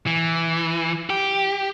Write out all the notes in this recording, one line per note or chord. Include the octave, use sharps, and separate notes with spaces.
E3
G4